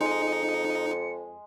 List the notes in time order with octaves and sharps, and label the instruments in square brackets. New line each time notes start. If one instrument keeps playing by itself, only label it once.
[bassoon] F2 [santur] G#3 [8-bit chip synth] D#4 [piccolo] C#7